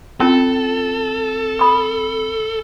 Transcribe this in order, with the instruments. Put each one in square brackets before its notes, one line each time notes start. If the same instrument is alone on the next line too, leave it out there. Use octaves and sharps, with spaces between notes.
[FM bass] C4 [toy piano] C#4 F4 [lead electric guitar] A4
[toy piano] B5 D#6